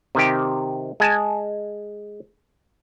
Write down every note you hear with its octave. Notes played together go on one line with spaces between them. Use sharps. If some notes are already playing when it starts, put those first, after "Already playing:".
C3 D#3 G4
G#3 G#5 A5